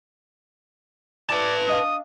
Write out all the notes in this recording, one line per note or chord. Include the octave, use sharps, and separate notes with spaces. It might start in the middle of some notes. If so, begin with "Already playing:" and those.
E4 B4 D5 A5
D4 D#5 F5 D#6